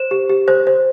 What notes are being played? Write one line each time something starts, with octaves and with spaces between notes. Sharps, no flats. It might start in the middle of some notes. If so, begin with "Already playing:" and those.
Already playing: C5 E7
G4
G4
C5
C5